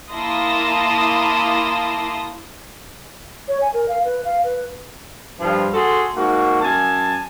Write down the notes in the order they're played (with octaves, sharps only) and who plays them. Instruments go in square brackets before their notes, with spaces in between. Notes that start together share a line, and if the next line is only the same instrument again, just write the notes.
[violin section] A#3 E4 A5 C6 D#6 A#6
[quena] C#5
G#5
A#4
F5
B4
F5
B4
[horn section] G2 F3
F#4 G#4 A4 C6
G#2 A#3 F#4
F#2 G#5 A5